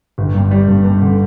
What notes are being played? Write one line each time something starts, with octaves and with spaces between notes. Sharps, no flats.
G1
G2
G3
G2
G2
D3